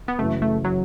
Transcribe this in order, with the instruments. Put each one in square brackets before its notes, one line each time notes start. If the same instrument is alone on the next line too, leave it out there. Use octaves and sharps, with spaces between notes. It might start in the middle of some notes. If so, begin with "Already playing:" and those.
[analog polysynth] B3
[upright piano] F#1 F#2 E3 [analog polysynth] A3
[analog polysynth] A3
F#3